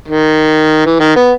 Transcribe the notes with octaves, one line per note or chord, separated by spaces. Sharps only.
D#3
E3
D#3
B3